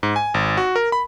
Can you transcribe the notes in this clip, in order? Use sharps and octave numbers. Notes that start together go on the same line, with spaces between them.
G#2
G#5
G#1
F#4
A#4
B5